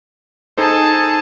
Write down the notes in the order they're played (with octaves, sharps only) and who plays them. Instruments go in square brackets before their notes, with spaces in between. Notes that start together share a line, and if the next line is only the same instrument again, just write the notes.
[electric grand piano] D#4 A4 C5 [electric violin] G#4 A5